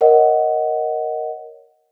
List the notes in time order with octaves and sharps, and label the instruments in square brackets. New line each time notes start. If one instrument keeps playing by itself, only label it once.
[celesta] A#4 C#5 D#5 F#5